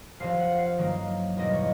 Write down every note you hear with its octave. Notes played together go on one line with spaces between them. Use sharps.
F1 F2 C3 F3 F5
F#5
F5
G2 D#3 F#3 A#3
E2 B2 G3 A#3 D#5
C#5